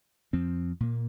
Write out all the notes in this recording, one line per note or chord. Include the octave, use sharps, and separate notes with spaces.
F2 F3 C4
A#2 A#3